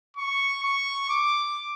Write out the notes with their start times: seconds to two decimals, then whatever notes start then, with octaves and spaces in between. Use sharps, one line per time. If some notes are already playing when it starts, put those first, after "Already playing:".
0.17 C#6
0.63 C#6
1.09 D6